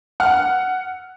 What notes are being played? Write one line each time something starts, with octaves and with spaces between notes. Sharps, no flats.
F#5 F6